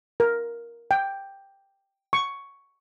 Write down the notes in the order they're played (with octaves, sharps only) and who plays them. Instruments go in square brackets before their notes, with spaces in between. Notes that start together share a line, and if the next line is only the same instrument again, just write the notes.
[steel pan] A#4
G5
C#6